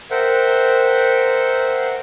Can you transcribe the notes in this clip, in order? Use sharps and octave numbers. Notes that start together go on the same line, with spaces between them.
A#4 C5 E5 F#5 G5